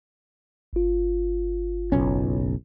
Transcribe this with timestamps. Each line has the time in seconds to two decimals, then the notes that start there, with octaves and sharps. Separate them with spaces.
0.73 G1 F4
1.92 F#1 B1 C#4